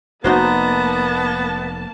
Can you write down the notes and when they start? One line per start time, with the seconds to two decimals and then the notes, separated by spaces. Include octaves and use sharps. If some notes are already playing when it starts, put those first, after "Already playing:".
0.24 F1 A#3 B3 D#4 F#4 C5 A5